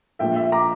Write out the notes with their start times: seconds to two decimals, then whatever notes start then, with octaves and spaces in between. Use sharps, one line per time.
0.19 A#1 A#2 F3 A3 E5 G5
0.36 E5
0.52 A#5 D6